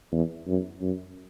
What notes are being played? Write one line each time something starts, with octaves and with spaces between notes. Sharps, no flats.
E2
F#2
F#2